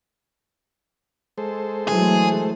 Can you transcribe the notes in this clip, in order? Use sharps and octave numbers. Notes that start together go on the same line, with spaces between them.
G#3 A4 C5
E3 F#3 A3 G#4